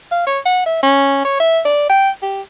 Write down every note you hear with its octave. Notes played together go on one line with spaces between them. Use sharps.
F5
C#5
F#5
E5
C#4
C#5
E5
D5
G5
G4